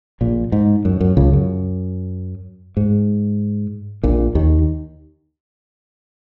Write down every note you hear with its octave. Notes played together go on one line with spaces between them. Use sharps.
A#1 A#2
G#2
F#2
F#2
C#2 C#3
F#2
G#2
A#1 A#2
D#2 D#3